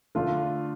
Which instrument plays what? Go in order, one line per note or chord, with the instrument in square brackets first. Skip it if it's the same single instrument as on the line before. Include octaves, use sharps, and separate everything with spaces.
[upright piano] D3 A3 D4 F4